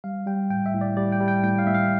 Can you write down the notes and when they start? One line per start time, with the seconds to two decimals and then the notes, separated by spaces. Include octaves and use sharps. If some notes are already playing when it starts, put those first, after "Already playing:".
0.04 G3 F5
0.27 G3 G5
0.50 A2 G5
0.66 E5
0.74 A2
0.81 D5
0.97 G3 D5
1.12 G5
1.20 G3
1.28 G5
1.43 A2 G5
1.59 F5
1.67 A2 E5
1.74 F5